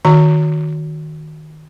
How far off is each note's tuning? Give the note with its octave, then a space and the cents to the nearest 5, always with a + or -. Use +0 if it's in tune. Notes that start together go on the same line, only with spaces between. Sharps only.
D#3 -10 F#4 -15 A#5 -25